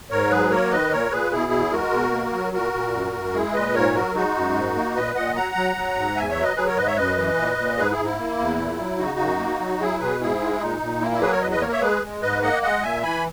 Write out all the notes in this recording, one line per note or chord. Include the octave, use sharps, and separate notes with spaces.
G#2 A#4 C#5
F#3 G#4 B4
A#3 A#4 C#5
D#3 B4 D#5
A#2 A#4 C#5
A#2 G#4 B4
B2 E4 G#4
E2
G#3 F#4 A#4
B2
A#3
F#3
A#2 F#4 A#4
A#2
F#2
F#2
G#3 E4 G#4
A#2 B4 D#5
G#2 A#4 C#5
F#3 F#4 A#4
G#3 D#4 F#4
F#2
G#2
A#3
A#2 B4 D#5
A#2 D#5 F#5
F#3 F#5 A#5
F#3
F#3
G#2
E2 E5 G#5
C#5 E5
F#3
B4 D#5
F#3 G#4 B4
A#4 C#5
G#2 B4 D#5
C#5 E5
F#2 B4 D#5
E3
A#2
A#2
G#2 G#4 B4
E4 G#4
G#2
E4
A#3
E2
A#2
F#3
C#3 D#4 F#4
F#2
A#3
F#3
F#3 E4 G#4
B2 G#4 B4
G#2 E4 G#4
G#3
A#2 D#4
A#2
A#3 E4
E4
F#3 G#4 B4
A#4 C#5
E2 B4 D#5
B4 D#5
A#3 A#4 C#5
C#5 E5
G#3 G#4 B4
G#3
G#2 B4 D#5
A#3 D#5 F#5
G#3 D#5 F#5
A#2 E5 G#5
E3 G#5 B5